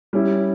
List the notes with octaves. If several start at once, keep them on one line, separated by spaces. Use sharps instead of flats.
G3 C#4 E4